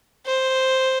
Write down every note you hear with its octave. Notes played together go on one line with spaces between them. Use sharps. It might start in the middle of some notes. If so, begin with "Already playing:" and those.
C5